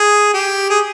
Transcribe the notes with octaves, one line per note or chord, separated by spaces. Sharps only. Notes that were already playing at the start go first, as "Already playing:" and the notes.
Already playing: G#4
G4
G#4